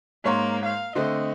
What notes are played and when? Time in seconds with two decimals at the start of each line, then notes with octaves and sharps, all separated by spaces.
0.25 G#2 A#3 C#5 C6
0.65 F5
0.95 D3 A3 C4 D#5